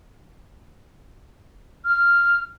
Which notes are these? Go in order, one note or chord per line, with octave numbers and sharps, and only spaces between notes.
F6